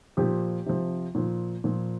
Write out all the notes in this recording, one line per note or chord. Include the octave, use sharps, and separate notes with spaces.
A#2 F3 G4
C3 F3
A#2 F3
A#2 F3